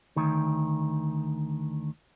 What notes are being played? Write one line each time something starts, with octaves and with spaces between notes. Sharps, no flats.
D2 D#3